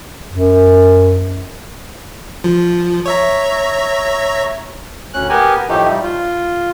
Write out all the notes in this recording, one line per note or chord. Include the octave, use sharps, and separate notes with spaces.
F#2
F3
C#5 E5 A#5
D2 C#4 F#6
B3 G4 A#4 G#5
A2 F3 A3 D#4 G4
G3
F4